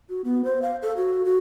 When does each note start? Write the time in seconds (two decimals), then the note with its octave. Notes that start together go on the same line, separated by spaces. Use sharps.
0.09 F#4
0.24 B3
0.44 C5
0.62 F5
0.82 A4
0.97 F#4
1.25 F#4